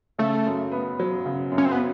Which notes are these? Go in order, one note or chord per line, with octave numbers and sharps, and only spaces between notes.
C#3 A3
F#2
B3
F#3
C#3
F#2
C#4
C4
B3